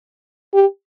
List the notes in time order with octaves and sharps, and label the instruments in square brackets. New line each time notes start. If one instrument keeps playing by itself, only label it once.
[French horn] G4